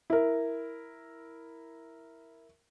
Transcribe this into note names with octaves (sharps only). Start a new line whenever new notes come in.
E4 A#4